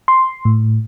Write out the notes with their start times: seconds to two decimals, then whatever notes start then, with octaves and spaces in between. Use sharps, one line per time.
0.08 C6
0.45 A2